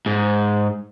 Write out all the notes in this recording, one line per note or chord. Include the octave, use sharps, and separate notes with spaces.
G#2